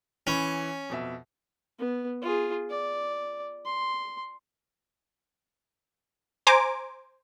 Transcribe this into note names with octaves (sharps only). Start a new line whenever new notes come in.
E3 C#4 B5
F2 B2 E5
B3
F4 G#4
D5
C6
C5 G#5 A#5 D6